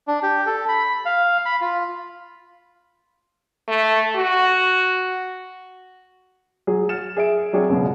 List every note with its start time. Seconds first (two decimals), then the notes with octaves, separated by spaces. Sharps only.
0.08 D4
0.23 G4
0.46 A4
0.68 B5
1.05 F5
1.45 B5
1.61 F4
3.68 A3
4.16 F#4
6.67 F#3 G#4
6.89 F6 A6 C#7 E7
7.17 G#4 E5 D7
7.53 F#3 C4 D4 G#4 C#5
7.69 C#2 F#2 B2 D3